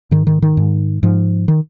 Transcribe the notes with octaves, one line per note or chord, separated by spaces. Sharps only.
G#2 D#3
D#3
D#3
G#2
G#2 F3
D#3